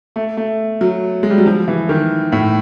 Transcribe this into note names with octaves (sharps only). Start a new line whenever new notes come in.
A3
A3
F#3
G#3
G3
F#3
F3
E3
D#3
A2